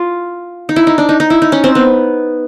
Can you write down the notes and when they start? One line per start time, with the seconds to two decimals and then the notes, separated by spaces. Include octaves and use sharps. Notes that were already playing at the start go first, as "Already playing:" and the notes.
Already playing: F4
0.69 D#4
0.76 E4
0.87 D#4
0.98 D4
1.09 D#4
1.20 D#4
1.30 E4
1.42 D#4
1.52 C#4
1.64 C4
1.75 B3